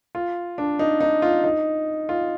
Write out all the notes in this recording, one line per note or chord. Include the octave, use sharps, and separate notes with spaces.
F4
D4
D#4
D#4
F4
D#4
F4